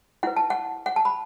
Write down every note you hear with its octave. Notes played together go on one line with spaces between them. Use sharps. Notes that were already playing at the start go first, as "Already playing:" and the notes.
E4 B4 F#5
A5
F#5
F#5
A5
B5